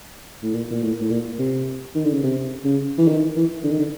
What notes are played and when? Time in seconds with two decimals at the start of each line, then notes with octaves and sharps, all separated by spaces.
0.43 A2
0.54 A#2
0.71 A#2
0.83 A2
1.01 A2
1.10 A#2
1.39 C3
1.95 D#3
2.04 D3
2.13 C#3
2.24 C3
2.65 C#3
2.98 E3
3.08 D#3
3.36 E3
3.63 D3
3.71 D#3
3.79 D3